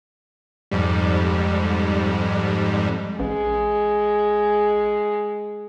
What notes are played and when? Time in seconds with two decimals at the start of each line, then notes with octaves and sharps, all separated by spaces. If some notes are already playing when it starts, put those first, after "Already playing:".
0.71 F2 G#2 G3
3.20 A1 G#3